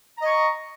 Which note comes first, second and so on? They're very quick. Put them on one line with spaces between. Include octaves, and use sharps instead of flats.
A#5 D#5 C#6